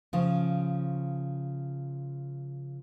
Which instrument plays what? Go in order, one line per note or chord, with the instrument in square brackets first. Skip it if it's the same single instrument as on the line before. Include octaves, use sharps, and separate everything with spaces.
[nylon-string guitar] C#3 F3